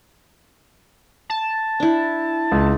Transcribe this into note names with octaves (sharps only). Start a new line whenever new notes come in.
A5
D4 E4
C#2